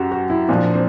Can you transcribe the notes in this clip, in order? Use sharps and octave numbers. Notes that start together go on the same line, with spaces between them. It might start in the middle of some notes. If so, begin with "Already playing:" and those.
Already playing: F#2 F#4 G4
F#4
E4
A#2 F3 D4
C4